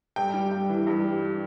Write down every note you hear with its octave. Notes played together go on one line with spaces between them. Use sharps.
G2 G5
G3
G2
E3
G2
G3